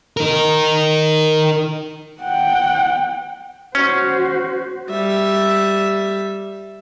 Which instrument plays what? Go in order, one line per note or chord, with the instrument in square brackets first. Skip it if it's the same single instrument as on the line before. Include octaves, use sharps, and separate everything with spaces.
[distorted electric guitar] D#4 A#4
[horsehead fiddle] F#5 G5
[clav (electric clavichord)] C#4 [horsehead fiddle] F#4 C5
[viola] G3 E5